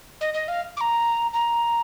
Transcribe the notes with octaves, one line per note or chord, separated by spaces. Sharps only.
D#5
D#5
F5
D6
A#5
A#5